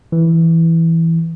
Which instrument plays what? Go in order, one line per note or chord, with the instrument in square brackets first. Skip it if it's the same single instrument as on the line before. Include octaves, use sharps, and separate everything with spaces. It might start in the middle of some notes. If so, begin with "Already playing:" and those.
[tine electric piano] E3